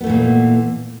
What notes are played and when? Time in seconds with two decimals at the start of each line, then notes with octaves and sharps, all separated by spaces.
0.01 B3
0.04 A3
0.07 E3
0.09 A#2